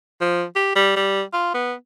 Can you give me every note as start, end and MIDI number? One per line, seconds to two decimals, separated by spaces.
0.21 0.45 53
0.56 0.75 67
0.76 0.93 55
0.96 1.23 55
1.33 1.54 65
1.54 1.74 59